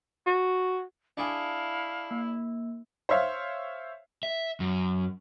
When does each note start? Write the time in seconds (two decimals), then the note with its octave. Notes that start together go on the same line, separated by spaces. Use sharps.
0.26 F#4
1.17 D4 E4 G#4 F5 G#5 A5
2.11 A#3
3.09 C5 C#5 E5 F5
4.23 E5
4.60 F#2